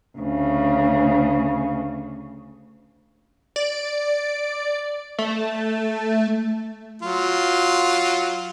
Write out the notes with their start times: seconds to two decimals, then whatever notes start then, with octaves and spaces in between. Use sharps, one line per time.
0.18 D2 C#3
3.56 D5
5.19 A3
7.02 F#3 F4